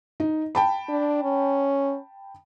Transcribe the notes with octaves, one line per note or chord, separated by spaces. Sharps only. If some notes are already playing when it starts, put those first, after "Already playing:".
D#4
G5 A5 B5
D4
C#4